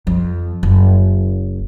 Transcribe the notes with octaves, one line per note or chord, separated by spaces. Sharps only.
F2
F#1